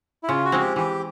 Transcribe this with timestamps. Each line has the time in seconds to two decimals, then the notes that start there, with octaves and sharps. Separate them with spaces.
0.23 E4
0.28 C#3 F4
0.45 F#4
0.52 F3 G#3 C4
0.60 G4
0.76 E3 G4